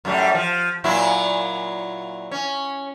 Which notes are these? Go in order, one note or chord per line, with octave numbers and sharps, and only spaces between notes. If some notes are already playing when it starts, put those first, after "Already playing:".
F#2 A2 G3
F3
A#2 F#3 E4
C#4